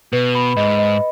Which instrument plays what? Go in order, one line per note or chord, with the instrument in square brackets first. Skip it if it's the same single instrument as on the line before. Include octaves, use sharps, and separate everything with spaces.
[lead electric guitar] B2 [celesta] B4
[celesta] B5
[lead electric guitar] G#2 [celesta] D#5
[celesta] D#5